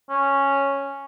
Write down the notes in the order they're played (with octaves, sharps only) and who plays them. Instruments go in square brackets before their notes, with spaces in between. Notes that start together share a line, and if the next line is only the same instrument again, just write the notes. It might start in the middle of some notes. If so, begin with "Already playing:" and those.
[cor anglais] C#4